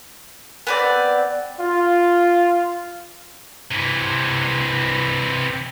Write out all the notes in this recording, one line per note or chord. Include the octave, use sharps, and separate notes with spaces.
B3 C4 D5
F4
C3 E3